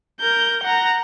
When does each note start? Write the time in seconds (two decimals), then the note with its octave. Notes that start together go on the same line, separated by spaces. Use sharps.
0.20 A#4 G6
0.63 F#5 A#5